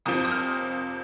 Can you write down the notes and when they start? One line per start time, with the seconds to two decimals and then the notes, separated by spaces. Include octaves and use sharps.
0.05 F2 C3 F3 C4 D#6
0.25 D#6
0.32 F6